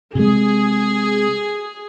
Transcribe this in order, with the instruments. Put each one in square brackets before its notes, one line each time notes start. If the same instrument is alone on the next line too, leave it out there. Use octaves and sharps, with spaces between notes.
[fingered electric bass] C3 G#3 [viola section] G#4